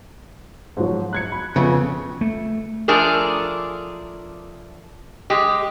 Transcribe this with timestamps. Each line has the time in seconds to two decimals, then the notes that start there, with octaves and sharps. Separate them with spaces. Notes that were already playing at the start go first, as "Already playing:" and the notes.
0.77 G#2 F3 F#3
1.13 F#6 G#6 C#7
1.32 B5
1.56 F2 C#3 B3
2.21 A3
2.88 F3 A3 D4 G#4 A#4
5.30 G#3 G4